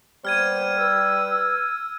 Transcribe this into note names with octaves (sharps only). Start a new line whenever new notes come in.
G3 A#3 B3 C5 F6 G#6 D#7
B4 E6